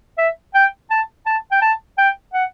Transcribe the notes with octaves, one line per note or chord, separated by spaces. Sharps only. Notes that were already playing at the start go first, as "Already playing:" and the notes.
E5
G5
A5
A5
G5
A5
G5
F#5